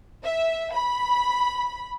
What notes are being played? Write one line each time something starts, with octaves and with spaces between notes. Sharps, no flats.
E5
B5